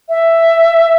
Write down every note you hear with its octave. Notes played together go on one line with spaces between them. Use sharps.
E5